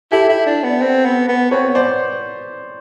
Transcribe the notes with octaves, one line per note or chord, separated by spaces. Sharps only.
E4 G4 A4
E4
D4
B3
C4
B3
B3
C4 B4 C#5
B3
C5 D5